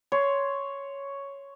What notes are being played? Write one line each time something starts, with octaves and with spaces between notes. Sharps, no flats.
C#5 C6